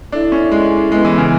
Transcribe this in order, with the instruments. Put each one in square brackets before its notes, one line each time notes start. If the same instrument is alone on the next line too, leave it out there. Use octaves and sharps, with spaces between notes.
[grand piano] D4 [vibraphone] E4 A4 E5
[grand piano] C#4
G#3
[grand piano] G#3 [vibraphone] B3 E4 B4
[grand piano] E3
C#3